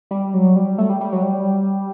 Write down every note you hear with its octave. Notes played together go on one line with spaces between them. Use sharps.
G3
F#3
G3
A3
G3
G3
F#3
G3